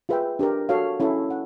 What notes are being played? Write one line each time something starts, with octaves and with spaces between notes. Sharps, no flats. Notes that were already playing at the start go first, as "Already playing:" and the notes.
F4 G#4 B4 E5 G5
D4 G4 A#4
F#4 A4 C#5 F5
C#4 E4 A4
F#5